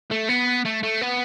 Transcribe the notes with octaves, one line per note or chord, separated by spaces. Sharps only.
A3
B3
A3
A3
B3